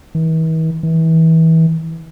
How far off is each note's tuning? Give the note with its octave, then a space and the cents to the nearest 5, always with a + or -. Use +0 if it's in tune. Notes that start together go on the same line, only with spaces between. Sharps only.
E3 -45
E3 -30